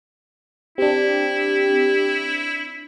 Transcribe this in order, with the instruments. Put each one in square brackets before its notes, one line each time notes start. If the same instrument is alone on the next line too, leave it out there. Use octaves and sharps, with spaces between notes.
[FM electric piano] C4 D4 [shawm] E4 [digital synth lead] G4